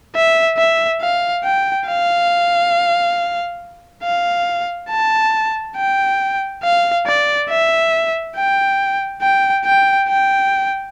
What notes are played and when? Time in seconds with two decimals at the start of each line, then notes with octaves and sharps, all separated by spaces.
0.15 E5
0.57 E5
1.01 F5
1.44 G5
1.87 F5
4.03 F5
4.89 A5
5.76 G5
6.63 F5
7.06 D5
7.50 E5
8.36 G5
9.22 G5
9.65 G5
10.08 G5